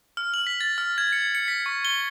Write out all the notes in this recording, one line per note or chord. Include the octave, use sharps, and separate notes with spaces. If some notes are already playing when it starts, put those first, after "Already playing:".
F6
F#7
B6
A6
F6
G#6
C#7
C#7
B6
C#6
G7